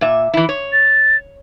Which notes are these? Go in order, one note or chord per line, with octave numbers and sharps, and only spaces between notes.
A#2 E5
E3 E4
C#5
A6